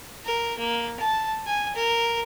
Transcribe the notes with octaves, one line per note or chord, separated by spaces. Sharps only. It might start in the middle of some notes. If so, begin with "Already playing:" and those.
A#4
A#3
A5
G#5
A#4